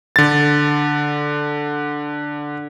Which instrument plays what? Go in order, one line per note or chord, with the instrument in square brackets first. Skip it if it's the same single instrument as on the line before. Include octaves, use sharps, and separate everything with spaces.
[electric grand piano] D3 A6